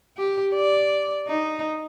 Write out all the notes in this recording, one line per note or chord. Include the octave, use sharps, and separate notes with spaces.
G4
D5
D#4